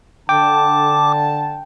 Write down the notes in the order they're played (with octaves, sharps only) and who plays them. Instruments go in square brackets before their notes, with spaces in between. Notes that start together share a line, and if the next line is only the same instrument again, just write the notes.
[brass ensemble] D3 A5 [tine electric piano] G5 [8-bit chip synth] D6